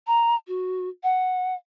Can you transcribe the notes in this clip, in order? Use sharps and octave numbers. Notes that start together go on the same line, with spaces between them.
A#5
F#4
F#5